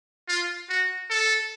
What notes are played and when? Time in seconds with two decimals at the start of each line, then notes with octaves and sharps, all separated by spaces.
0.28 F4
0.69 F#4
1.10 A4